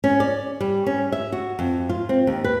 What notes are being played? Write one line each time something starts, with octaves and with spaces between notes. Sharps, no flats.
C#4
D5
G3
C#4
E5
F#4
F2
F4
C4
D#2
B4